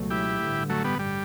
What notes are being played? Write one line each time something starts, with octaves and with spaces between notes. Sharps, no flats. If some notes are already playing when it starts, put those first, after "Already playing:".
Already playing: C#2 B2 F#3 A3
E4 G4
A1 G2 D3
F#3 A3
G3 B3
G3